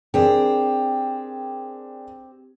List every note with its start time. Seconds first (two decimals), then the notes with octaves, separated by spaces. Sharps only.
0.14 C4 D4 G4 G#4 A#4